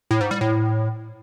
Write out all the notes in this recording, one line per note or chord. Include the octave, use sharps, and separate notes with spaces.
A2
G#2
G3
A2